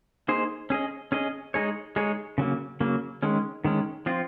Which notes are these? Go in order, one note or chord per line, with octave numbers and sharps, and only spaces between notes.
A#3 D#4 G#4 C5
C#4 G#4 D#5
C#4 G#4 D#5
G#3 D#4 G#4 C#5
G#3 D#4 G#4 C#5
C#3 F#3 A#3
C#3 F#3 A#3
D#3 G#3 C#4
D#3 G#3 C#4
F3 C4 F4